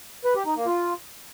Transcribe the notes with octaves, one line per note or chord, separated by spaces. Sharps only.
B4
G4
D#4
A#3
F4